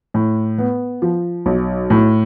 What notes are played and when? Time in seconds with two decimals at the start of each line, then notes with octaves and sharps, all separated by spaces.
0.14 A2
0.58 B3
1.02 F3
1.46 B1
1.90 A2